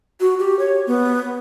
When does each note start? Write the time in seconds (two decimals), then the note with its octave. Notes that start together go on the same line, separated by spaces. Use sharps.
0.20 F#4
0.39 G4
0.59 C#5
0.87 B3